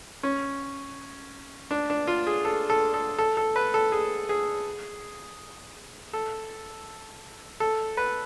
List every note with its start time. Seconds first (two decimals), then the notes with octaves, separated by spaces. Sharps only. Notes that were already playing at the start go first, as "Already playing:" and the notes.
0.23 C#4
1.71 D4
1.90 D4
2.07 F4
2.27 G#4
2.45 A4
2.70 A4
2.94 A4
3.18 A4
3.37 A4
3.56 B4
3.74 A4
3.92 G#4
4.29 G#4
6.13 A4
7.60 A4
7.97 B4